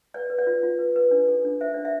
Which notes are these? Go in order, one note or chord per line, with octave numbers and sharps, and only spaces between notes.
B4 D5
B4
D5
F4
F4
B4
B4
D4
A4
D4
C5 E5
D4 D5
E5